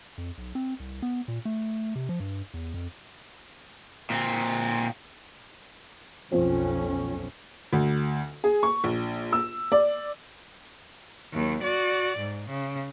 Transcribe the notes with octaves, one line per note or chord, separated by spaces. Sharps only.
F2
B1
C4
C2
B3
A#2
A3
C3
F3
G2
E2
F2
A#2 C4
B1 F2 F3 C4 C#4 C5
D2
G#4
C#6
A#1
E6
D5
D#2 F#3
F#4 D5
G#2
C#3